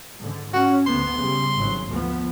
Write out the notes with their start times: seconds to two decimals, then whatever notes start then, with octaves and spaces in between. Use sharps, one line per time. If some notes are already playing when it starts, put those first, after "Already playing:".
0.19 G#2 D3
0.53 C#4 F#4
0.87 D2 B3 C6
1.17 C#3 G3
1.54 G#1 G#2 F#3
1.89 D2 F3 B3